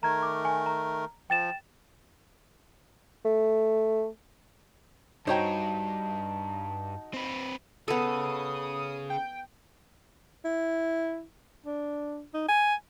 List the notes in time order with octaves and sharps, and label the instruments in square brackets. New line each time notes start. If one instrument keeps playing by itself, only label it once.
[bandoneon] D#3 A3 A#4 [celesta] A#5 G#6
[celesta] D6
G#5
A#5
[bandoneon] F3 [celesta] G5 A6 E7
[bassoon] A3
[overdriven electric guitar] G2 [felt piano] D#4 F#4 A#5 [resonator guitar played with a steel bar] C5 C#5 G5 [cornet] A5
[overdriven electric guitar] C4 B4
[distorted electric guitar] C#3 [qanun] B3 A4 [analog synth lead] D#6
[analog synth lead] G5
[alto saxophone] E4
D4
D#4
G#5